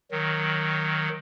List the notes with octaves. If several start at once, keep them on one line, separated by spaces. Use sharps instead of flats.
D#3 F#3